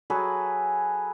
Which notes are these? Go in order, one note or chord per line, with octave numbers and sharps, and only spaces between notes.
F#3 G#4 A4 B4